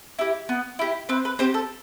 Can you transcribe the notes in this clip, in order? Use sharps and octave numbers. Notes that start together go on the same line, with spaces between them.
E4 G4
B3
E4 G4
C4 B4
B4
C4 G4 C5
A4